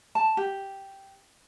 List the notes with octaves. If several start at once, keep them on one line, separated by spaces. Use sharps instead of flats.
A5
G4